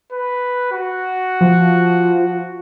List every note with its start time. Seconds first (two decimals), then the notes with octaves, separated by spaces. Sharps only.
0.12 B4
0.72 F#4
1.41 F3